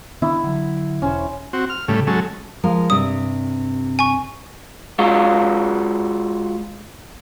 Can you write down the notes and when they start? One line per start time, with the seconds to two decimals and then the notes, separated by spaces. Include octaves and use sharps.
0.22 D#3 B3 D4 E4
0.44 D3 F#3
1.02 E1 C#4 C5
1.53 C4 F#4
1.70 F6
1.88 A2 C#3 G3 A3
2.07 F#3 G#3 C#4 A4
2.63 F3 G#3 A#4
2.90 G2 C3 D#6
3.99 G#5 C#6
4.99 G#3 F4 F#4